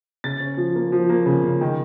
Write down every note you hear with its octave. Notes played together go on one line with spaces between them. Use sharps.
C#3 A6
C#4
F3
A#3
F3
A#3
C#3
C#3
D#3